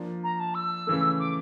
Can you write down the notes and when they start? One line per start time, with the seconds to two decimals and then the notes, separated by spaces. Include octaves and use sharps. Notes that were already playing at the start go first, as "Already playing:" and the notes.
Already playing: F3 A#3 D4
0.24 A#5
0.40 A5
0.55 E6
0.87 C#3 E3 A3
1.19 D6